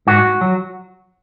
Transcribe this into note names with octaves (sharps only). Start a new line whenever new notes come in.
G#2 F#4
F#3